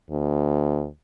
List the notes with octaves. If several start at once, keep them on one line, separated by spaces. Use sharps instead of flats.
D2